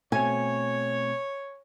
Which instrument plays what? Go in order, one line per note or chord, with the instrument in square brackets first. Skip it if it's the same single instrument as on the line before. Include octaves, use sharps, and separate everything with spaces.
[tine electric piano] B2 A3 C4 [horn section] C#5 [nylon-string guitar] G#5